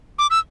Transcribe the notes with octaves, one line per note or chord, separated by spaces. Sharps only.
D6
E6